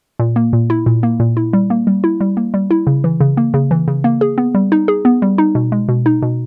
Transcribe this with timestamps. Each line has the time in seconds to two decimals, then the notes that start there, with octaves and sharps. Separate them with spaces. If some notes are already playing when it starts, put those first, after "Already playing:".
0.19 A#2
0.36 A#3
0.53 A#2
0.70 E4
0.86 A#2
1.03 A#3
1.20 A#2
1.37 E4
1.53 G3
1.70 A#3
1.87 G3
2.04 E4
2.21 G3
2.37 A#3
2.54 G3
2.71 E4
2.87 C#3
3.04 E3
3.20 C#3
3.37 A#3
3.54 C#3
3.71 E3
3.88 C#3
4.04 A#3
4.21 G#4
4.38 B3
4.55 G3
4.72 D#4
4.88 G#4
5.05 B3
5.22 G3
5.38 D#4
5.55 B2
5.72 G#3
5.89 B2
6.06 D#4
6.22 B2